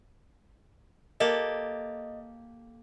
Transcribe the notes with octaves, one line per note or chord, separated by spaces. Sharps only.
A#3 G4 A4 D#5